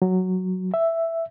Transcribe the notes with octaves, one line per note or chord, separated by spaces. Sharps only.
F#3
E5